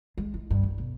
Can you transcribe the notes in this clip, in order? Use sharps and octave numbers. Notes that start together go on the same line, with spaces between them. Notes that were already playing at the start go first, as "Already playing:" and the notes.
G#3
E4
G2
F#2
B1